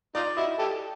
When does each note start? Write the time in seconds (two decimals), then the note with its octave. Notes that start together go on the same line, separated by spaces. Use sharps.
0.15 D#4 F4 D5
0.37 E4 F#4 D#5
0.59 G4 A4